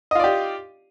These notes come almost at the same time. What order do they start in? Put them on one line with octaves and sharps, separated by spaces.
D#5 F4 D5 G4